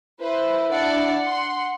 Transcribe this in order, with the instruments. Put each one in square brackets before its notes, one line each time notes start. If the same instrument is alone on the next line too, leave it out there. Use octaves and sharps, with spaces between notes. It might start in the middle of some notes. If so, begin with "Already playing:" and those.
[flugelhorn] E4 [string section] B4 C5
[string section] D4 D5 [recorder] F#5
[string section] C6